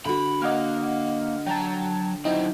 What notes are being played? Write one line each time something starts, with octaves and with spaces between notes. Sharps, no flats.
D3 F#4 B5
A#3 D#5 F#5 F6
F#3 G5 A5 A#5
F#3 C4 D#4 E4 G5